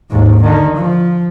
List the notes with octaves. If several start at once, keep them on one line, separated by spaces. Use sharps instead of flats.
D#2 G#2
D3 D#3
F3